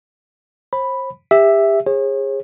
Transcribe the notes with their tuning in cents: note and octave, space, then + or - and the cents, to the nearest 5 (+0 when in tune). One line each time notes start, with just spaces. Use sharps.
C5 +35 B5 +0
G4 +35 E5 +0
G#4 -25 C#5 -40